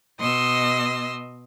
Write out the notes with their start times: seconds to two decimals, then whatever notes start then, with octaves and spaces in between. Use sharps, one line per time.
0.19 B2 D#5 C6 E6